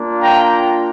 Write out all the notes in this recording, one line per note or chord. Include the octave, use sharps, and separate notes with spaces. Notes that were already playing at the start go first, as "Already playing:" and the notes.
Already playing: A#3 D4 F4
G5 A#5